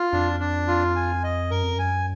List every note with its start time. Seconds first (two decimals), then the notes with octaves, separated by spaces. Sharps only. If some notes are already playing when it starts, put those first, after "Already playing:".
Already playing: F4
0.13 F2 D4
0.40 D4
0.68 F4
0.96 G#5
1.24 D#5
1.51 F#2 A#4
1.63 F2
1.75 F#2 G#5